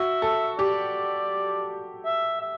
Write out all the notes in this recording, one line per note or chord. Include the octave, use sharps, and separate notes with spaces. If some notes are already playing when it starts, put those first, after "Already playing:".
Already playing: F#4 E5
A4
G4 D5
E5
E5